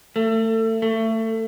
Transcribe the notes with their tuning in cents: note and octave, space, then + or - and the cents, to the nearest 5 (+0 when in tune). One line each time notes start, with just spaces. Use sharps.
A3 +30
A3 +25